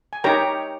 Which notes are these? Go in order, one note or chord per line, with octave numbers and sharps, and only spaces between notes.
G#5
D#4 G4 A#4 C#5 G5 A#5